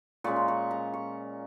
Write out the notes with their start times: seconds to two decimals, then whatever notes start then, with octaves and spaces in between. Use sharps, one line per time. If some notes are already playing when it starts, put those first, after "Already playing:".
0.24 A#2 G#3 C#4 C#6
0.36 A#5
0.48 C#6
0.71 A#5
0.94 C#6